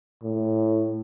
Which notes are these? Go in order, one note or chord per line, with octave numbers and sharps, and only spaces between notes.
A2